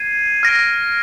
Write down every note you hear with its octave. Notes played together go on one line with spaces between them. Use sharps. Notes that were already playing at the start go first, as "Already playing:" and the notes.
Already playing: G#6 C7 D#7
F6 A#6 D7